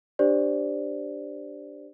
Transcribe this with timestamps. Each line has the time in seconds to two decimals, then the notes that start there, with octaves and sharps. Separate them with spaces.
0.19 D4 G4 C5 D5